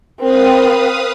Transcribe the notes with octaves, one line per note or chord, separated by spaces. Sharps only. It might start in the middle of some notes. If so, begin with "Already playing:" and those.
C4 A#4 B4 F5 D#6